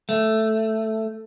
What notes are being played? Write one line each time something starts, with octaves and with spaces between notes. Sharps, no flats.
A3